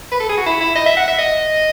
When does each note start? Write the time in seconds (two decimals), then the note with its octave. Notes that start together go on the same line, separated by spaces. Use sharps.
0.11 B4
0.20 A4
0.29 G#4
0.38 F#4
0.46 E4
0.60 E4
0.75 D#5
0.86 E5
0.97 F#5
1.08 E5
1.18 D#5